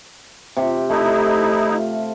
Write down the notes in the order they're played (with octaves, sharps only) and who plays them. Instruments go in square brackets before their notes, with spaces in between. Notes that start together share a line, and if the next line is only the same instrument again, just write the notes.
[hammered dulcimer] C3 G4
[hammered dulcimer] A3 [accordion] D#4 E4
[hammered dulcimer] F5